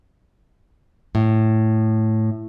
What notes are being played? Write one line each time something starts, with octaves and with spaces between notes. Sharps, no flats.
A2